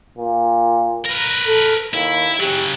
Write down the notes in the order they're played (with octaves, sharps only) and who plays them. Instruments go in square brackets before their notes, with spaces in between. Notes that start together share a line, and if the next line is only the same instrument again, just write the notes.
[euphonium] A#2
[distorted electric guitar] A#4 B4
[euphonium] A4
[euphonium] D#2 [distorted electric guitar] E4
[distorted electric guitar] C#3 F#3 [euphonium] G4